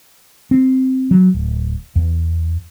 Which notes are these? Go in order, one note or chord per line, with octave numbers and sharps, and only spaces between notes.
C4
F#3
D1
E2